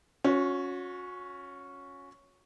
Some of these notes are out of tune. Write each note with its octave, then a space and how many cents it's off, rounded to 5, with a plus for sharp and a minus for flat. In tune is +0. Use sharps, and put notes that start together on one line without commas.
C#4 +0 F#4 -35